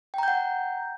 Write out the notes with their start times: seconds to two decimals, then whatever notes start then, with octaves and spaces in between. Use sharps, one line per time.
0.14 G5
0.18 A#5
0.23 G6
0.28 F#5